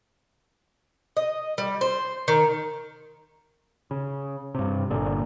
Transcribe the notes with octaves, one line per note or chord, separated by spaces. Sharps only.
D#5
G3
C5
D#3
C#3
G2 C3
G1 A#2 D3